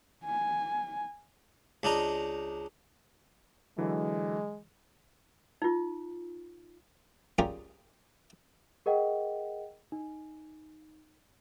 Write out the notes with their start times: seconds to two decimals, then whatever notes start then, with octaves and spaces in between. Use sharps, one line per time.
0.24 G#5
1.83 C#2 D4 D#4 A#5
3.78 D3 E3 F#3 G#3
5.62 D#4 F4
7.38 G3 C#4 F4 G4 G#4 A#4
8.86 G#4 A#4 D#5 F#5 G5
9.92 D#4